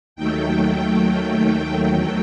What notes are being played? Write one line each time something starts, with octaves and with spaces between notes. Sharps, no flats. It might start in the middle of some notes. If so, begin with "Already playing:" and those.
D#2 D#3 F#3 A3 G5
E2 D#3 F#3 A3 G5